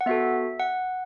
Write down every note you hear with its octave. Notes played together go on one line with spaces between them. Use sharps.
F#5
B3 F#4 A4 E5
F#5